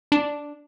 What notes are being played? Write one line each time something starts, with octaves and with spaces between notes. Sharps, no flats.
D4